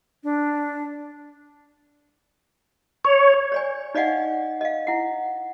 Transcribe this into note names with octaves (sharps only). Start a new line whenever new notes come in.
D4
C#5
C#5 D5 G#5
D#4 D5 D#5 F5 F#5 G#5
D#5 F5
E4 F#5